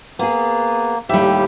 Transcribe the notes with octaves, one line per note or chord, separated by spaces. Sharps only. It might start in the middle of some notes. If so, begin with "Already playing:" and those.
A#3 B3 G#4
D#2 A2 G3 G4 E5